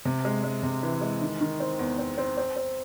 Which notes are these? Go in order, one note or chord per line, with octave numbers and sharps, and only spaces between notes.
C3
G#3
G#3
C3
E3
G#3
D#3
D#3
C4
E2
C4
C4
C4
C4